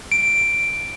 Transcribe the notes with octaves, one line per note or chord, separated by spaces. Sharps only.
D7